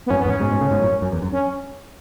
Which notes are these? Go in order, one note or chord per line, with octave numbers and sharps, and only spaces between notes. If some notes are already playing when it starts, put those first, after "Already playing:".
B3
F#2 A2 C#4
B3
E2 G#2
C#4
G#2 B2
G#2 B2
A2 C#3
G#2 B2
F#2 A2
F#2
E2
F#2
C#4